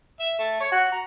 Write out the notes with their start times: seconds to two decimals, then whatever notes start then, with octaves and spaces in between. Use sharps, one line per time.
0.20 E5
0.39 A3
0.60 C#5
0.72 F#4
0.92 A#5